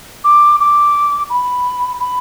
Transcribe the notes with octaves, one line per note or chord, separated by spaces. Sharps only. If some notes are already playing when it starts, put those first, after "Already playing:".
D6
D6
B5
B5